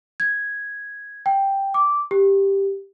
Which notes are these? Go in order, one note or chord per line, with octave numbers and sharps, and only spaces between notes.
G#6
G5
D6
G4